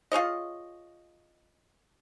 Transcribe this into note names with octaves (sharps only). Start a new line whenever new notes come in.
F4 G#4 C#5 D#5